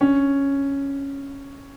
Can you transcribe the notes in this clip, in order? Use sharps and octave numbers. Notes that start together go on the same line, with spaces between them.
C#4